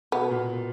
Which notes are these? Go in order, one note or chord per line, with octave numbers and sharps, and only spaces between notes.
B2 B3
A#2
B2